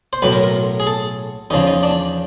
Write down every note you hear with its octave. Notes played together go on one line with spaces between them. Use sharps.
C5
B1 A2 F#3 B4
A#4
A#4
G#4
A4
E2 C#3 F3 D#4
D#4
D4